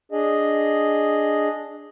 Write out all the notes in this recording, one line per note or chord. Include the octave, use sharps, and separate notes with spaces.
D4 G#4 D#5